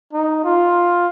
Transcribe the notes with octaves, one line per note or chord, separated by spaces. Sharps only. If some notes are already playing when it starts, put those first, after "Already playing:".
D#4
F4